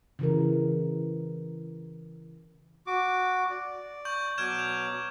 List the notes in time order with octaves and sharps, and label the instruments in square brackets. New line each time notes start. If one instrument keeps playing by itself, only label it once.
[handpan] C#3 E3 A#4
[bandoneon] F#4 D6
D5
[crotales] C#6 G6 F#7
[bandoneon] B2 F#3 D6 [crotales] F6 G#6 E7
[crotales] F7